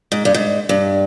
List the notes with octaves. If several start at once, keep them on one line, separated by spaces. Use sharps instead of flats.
G#2
G2
G#2
G2